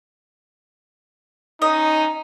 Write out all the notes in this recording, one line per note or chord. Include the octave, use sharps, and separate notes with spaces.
C#4 D#4 D#5 A#5